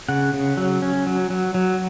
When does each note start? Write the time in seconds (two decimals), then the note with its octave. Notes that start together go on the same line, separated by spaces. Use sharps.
0.09 C#3 F#5
0.34 C#3
0.57 F#3
0.82 C#4
1.07 F#3
1.30 F#3
1.54 F#3